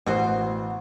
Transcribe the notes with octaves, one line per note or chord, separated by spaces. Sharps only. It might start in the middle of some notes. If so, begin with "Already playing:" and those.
A1 B2 F#4 C5